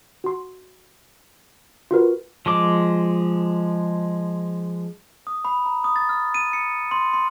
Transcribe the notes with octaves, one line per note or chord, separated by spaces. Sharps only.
F#4 C6
F4 F#4 A#4 B4
F3 G#3 D6
D#6
B5
A#5
D#6
A6
F6
D#7
C#7
C6
C6